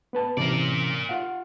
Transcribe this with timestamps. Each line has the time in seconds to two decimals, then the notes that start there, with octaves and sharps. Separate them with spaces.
0.13 B3 B4 A5
0.37 C3 E3 C#4 A#4 D5
1.09 F4 F5 F#5